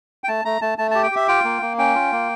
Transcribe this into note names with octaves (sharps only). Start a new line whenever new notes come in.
G5
A3 A5
A3 A#5
A3 A5
A3 A5
G4 A5
G5
G4 E5
F4 G5
A#3
A#3
C#4 G5
F4
A#3